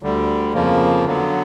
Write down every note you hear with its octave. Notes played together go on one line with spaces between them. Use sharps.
D2 D3 G3
F2 C#3 F3 A#3
D3 F#3 B3